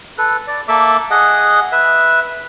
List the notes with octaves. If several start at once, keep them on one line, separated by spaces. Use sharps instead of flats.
A4 B4
D5
A#3 A4 E5 D6
G#4 D#5 F#5
B4 E5